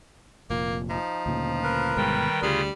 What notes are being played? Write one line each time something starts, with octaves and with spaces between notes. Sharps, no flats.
F1 A#2 A#3
F3 D#4
D2 A#2 C#3
A#4 B4
G1 B2 D#3 G3 G#3 G5
D2 C#3 G3 F4 G#4